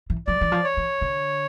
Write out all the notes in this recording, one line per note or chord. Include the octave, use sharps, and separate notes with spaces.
E3
F3 D5
E3
F3
C#5
E3
D3